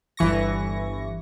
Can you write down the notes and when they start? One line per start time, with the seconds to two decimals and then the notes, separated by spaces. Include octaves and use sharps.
0.17 G1 E3 C#6 A#6